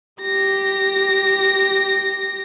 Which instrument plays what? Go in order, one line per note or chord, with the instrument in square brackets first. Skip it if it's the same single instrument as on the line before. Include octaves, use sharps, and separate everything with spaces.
[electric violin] G4 A#6